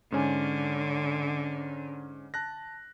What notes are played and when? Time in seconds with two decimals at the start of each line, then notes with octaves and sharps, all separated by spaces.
0.12 G#2 D3 C#4 G#5
2.34 A5 F#6 A#6